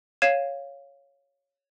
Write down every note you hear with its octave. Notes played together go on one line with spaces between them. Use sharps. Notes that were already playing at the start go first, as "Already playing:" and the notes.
C#5 F5 G#6 C7 D#7 E7